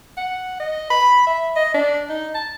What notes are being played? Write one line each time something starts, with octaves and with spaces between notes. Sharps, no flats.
F#5
D#5
B5
E5
D#5
D4
D#4
A5